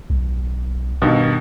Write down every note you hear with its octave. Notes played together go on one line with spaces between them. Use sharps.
B1
G2 B2 D#3